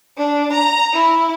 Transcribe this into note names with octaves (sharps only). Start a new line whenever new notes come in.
D4
A#5
E4